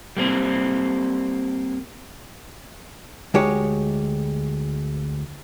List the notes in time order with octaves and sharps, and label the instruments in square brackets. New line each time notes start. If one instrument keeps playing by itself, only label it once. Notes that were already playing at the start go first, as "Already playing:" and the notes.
[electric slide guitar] G3 A#3 C4
[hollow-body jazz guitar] D2 G#3 G4 C#5